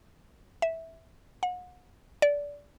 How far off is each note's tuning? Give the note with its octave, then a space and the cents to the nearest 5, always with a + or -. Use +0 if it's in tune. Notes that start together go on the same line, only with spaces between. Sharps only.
E5 -10
F#5 -40
D5 -20